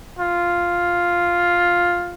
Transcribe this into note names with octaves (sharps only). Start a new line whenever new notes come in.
F4